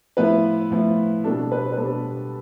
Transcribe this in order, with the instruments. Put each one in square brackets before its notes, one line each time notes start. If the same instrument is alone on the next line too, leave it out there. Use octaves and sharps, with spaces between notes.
[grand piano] A2 F3 B3 E4 B4
A2 F3 B3 E4
B2 G3 D4 A4
B4
B4
B2 G3 D4 A4